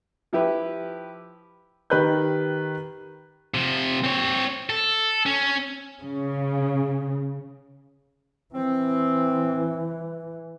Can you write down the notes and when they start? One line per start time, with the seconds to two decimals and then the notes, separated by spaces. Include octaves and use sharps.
0.33 F3 E4 G4 B4
1.90 D#3 G4 B4 F#6 G6
3.54 C3 F3
4.04 C4 C#5
4.70 A4
5.26 C#4
6.01 C#3
8.54 E3 C4